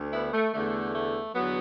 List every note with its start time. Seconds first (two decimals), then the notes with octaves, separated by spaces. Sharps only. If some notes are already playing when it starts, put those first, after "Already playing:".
Already playing: D2 D3
0.12 B3 E4
0.33 A3
0.53 E2 D3 A3
0.95 A3
1.35 E2 D3 F#3 B3